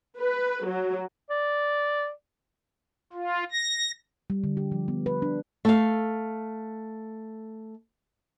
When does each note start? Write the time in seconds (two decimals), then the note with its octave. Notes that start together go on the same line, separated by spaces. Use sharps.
0.19 B4
0.66 F#3
1.30 D5
3.13 F4
3.52 A#6
4.30 G3
4.44 D3
4.57 G4
4.72 F3
4.88 B3
5.06 B4
5.22 D4
5.65 A3 F5